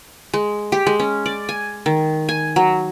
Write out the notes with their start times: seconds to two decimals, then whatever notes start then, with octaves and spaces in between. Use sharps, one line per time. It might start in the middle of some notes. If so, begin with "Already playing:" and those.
0.33 G#3
0.72 G4
0.87 G#3
0.99 C#4
1.26 D5
1.49 G#5
1.86 D#3
2.29 G#5
2.56 F#3